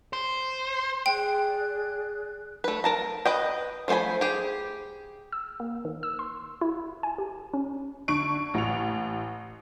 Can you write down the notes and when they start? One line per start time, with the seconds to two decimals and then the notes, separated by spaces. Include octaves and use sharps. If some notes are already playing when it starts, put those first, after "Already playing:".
0.13 C5
1.06 G#4 D5 G5 F#6
2.64 A3 B4
2.84 A#4 A5 A#5
3.25 B4 D#5 G5
3.88 F3 A3 C5 G#5 B5
4.21 G4 G#4
5.33 E6
5.60 A#3
5.85 D#3
6.03 E6
6.19 C6
6.61 E4
7.03 G#5
7.18 G4
7.54 C#4
8.08 D3 C#6 D7
8.54 A1 F7